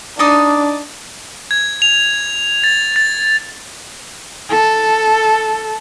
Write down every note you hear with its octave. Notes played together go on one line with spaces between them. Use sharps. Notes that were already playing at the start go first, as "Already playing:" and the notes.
D4 D#4 D5 D#6
G#6
F7
A6
A6
A4